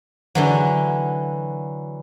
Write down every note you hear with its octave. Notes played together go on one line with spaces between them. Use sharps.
D3 E3 F#3